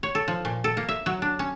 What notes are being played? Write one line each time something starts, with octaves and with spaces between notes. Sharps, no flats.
C#5
A4
F3
A#2
A4
A#3
E5
F#3
D4
C#4